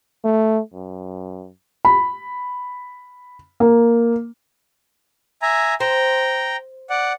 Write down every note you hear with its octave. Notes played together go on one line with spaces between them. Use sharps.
A3
F#2
B5
A#3
E5 G#5 A#5
C5 G5 A#5
D5 F#5